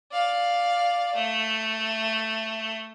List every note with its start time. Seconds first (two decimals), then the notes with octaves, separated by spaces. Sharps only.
0.12 D5 F5
1.15 A3